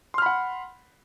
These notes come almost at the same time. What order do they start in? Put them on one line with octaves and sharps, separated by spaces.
C6 F6 B5 F#5